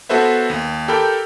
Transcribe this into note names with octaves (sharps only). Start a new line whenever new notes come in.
B3 F#4 A4 B4 C5 E5
D#2
G4 A4 A#4 G5 B5 G6